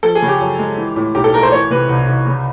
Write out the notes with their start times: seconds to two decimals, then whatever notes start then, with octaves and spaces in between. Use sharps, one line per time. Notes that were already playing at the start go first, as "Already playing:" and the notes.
0.03 F3 A4
0.15 G#4
0.22 C#3
0.28 G4
0.41 F#2
0.59 G#3
0.77 E3
0.96 A2
1.15 B1 G4
1.24 A4
1.33 A3 A#4
1.43 C5
1.52 E3 C#5
1.70 C3 B4
1.89 C2
2.08 C2
2.27 C#3